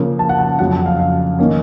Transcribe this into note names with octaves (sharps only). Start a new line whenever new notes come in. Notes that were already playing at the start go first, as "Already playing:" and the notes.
Already playing: C#3 F3 A#3
A5
F#5
A5
F2 C#3 F#3 F#5
A5
F5
F5
D#3 A#3 C#4